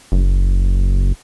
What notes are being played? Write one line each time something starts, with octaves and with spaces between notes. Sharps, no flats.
F#1